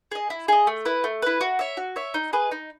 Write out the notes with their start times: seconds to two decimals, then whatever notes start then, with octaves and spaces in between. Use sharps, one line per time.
0.11 G#4 D#5
0.30 E4
0.48 G#4 D#5
0.67 A3
0.85 E4 B4
1.04 A3
1.22 E4 B4
1.41 F#4
1.59 C#5 E5
1.77 F#4
1.96 C#5 E5
2.14 D#4
2.33 G#4 B4 D#5
2.51 D#4